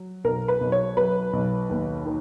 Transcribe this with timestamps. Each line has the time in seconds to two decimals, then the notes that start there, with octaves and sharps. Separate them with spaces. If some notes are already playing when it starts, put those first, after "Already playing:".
Already playing: F#3
0.24 B1 A#4
0.48 B4
0.61 B1
0.72 C#5
0.97 F#3 B4
1.33 B1
1.69 D#2
2.05 D#3